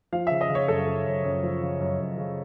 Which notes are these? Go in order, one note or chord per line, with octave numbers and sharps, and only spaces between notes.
F3 F5
C#3 E5
D#5
C#3
C#5
F#2 A4
C#3
F#2
F#2
F3
C#3
F#2
F#2
C#3